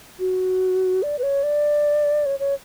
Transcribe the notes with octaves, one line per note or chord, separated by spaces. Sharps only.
F#4
D5
B4
C#5
D5
C#5
C#5